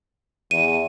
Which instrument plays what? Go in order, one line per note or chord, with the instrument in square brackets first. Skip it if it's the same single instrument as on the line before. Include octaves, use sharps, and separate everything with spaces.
[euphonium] E2 [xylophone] D#7